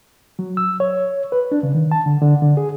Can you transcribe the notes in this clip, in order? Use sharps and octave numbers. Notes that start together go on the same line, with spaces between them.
F#3
E6
C#5
B4
D4
C#3
D#3
A5
D3
D3
D3
G#4